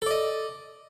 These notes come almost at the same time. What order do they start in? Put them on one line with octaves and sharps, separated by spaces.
A4 D5 D#5